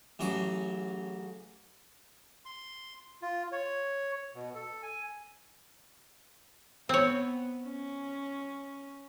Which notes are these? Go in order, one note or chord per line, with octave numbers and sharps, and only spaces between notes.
A1 C#3 F#3 D6
C6
F4
C#5
B2
A4
G#5
B3 C4 C#5
C#4